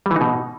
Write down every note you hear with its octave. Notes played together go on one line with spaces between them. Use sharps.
G3
E3
D#4
B2